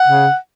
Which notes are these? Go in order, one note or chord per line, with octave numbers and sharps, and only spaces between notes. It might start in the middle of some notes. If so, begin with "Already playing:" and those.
Already playing: F#5
C#3